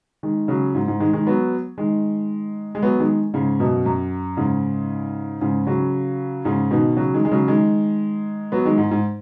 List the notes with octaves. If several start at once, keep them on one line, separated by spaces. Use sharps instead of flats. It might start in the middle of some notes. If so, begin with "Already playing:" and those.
D#3 G#3
C#3 F#3
G#2
G#2
D#3 G#3
D#3 G#3
F#3 B3
D#3 G#3
G#3
F#3 B3
D#3 G#3
G#2 C#3
F#2 B2
F#2
G#2 C#3
G#2 C#3
C#3 F#3
G#2 C#3
B2 D#3
C#3 F#3
D#3 G#3
G#3
C#3 F#3
D#3 G#3
F#3 B3
D#3 G#3
G#2
G#2